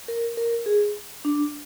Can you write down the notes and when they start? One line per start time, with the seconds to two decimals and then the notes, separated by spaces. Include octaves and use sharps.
0.08 A#4
0.37 A#4
0.66 G#4
1.25 D4